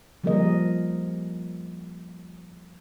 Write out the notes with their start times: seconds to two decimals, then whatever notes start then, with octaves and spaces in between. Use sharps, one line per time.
0.24 F3 G3 A#3 G#4 A#4 D#5